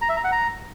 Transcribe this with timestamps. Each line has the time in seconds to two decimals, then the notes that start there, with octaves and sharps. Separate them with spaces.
0.01 A#5
0.09 E5
0.17 A#5
0.24 F#5
0.32 A#5